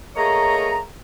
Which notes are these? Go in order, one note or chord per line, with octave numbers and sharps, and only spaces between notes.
A3 A#3 G#4 C#5 D#5 A#5